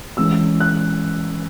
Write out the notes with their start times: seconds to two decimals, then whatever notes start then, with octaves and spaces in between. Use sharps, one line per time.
0.17 E3 G#3 C#4 E6
0.60 F#6